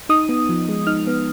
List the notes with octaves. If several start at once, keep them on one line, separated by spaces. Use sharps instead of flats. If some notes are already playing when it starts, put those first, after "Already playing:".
D#4 D#6
B3
F3
G#3
D#4 F6
B3